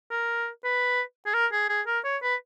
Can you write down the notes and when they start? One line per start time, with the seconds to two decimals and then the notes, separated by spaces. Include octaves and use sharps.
0.11 A#4
0.64 B4
1.26 G#4
1.34 A#4
1.52 G#4
1.69 G#4
1.87 A#4
2.04 C#5
2.22 B4